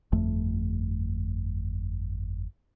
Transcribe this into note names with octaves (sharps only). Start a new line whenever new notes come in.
G1 F2 A3